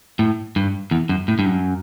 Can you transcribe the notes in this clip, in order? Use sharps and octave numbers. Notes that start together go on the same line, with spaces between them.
A2
G2
E2
F#2
A2
G2
F#2